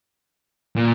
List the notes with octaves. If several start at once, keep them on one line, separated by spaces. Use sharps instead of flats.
A#2